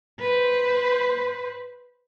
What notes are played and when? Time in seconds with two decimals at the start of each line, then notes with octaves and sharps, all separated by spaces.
0.20 B4 C5